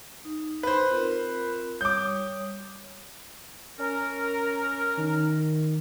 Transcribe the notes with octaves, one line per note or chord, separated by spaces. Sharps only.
D#4
B4 C5
C4 F4 A#4
G3 C#5 D6 D#6 G6
C#4 A#4
D#3